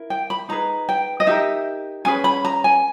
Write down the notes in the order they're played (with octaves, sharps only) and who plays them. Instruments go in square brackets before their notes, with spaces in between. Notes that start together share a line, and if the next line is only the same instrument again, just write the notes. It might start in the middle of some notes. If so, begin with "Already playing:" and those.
Already playing: [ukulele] E4 A#4
G5
B5
D#4 G#4 B4 A#5
G5
D#5
D#4 G4 A#4 E5
C#4 G#4 B4 G#5
B5
A#5
G#5